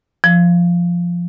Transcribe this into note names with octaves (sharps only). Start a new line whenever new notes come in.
F3